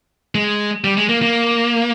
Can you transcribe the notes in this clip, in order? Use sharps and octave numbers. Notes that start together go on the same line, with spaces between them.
G#3
G3
G#3
A#3
A#3